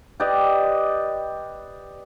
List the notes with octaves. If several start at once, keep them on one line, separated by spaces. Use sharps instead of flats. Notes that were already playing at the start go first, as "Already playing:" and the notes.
G4 B4 D5 D#5